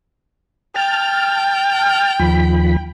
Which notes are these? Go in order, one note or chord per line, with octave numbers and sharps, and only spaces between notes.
G5 A5 F6
D#2 F3 B5